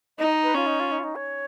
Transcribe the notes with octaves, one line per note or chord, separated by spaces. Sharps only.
D#4 D#5
B4
C#4 F4
D#4
F4
D#4
F4
D#4
C#5